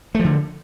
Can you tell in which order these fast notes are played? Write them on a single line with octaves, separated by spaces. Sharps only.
A3 F3 D3